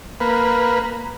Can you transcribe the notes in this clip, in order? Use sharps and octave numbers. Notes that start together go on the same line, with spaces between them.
A#3 B4